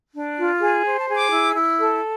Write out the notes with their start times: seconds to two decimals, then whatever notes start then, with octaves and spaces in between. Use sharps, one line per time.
0.14 D4
0.38 F4
0.61 G#4
0.85 C5
1.00 A5
1.09 G#4
1.15 D6
1.31 E4
1.56 E4
1.79 A4